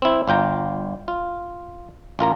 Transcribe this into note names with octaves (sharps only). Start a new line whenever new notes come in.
C4 E4
G1 F4 G5 A#5
F4
A1 F4 A#4 A#5